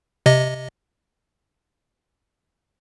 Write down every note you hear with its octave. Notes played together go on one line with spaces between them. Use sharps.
C3 D#5